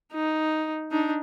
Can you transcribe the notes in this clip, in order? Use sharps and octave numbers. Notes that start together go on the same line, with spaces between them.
D#4
D4 D#4